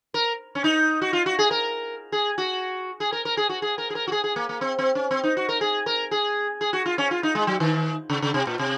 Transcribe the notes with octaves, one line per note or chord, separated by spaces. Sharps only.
A#4
C#4
D#4
F#4
F4
F#4
G#4
A#4
G#4
F#4
G#4
A#4
A#4
G#4
F#4
G#4
A#4
G#4
A#4
F#4
G#4
G#4
A#3
A#3
C4
C4
C#4
C4
D#4
F#4
A#4
G#4
A#4
G#4
G#4
F#4
F4
C#4
F4
D#4
G#3
F#3
D#3
C#3
C#3
C3
A#2
C3